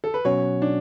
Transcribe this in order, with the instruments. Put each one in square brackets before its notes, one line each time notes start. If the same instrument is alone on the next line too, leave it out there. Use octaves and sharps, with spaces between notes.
[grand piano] A4
B4
[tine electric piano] B2 F#3 C#4 F#4 [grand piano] C#5
[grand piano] D4